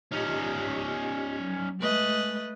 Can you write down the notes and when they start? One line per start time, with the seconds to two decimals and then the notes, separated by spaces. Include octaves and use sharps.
0.12 C#4 D#4 F4 G4 D#5
1.39 F#3
1.80 G#3 A3 B4 D#5